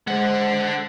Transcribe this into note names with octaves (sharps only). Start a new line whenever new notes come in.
D3 G#3 C5 F#5